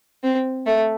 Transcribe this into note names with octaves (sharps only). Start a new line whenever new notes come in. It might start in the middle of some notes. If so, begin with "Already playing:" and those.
C4
A3